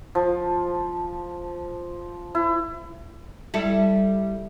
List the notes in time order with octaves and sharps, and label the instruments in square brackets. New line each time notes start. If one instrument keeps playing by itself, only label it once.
[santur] F3
E4
[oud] G3 E4 A4